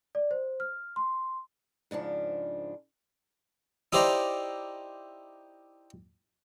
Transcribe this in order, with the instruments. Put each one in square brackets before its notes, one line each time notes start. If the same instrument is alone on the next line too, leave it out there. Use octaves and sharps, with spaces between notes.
[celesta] D5
C5
F6
C6
[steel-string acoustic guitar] G#2 C#3 F3 D4
[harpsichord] D#4 E4 G4 C5 D5 A#5